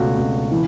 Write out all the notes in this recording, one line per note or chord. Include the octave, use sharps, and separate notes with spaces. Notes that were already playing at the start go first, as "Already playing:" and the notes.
Already playing: C#2 B2 A3 F#4
C#2
E3